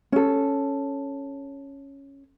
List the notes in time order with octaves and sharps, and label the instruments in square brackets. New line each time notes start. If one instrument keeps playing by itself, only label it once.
[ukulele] C#4 A4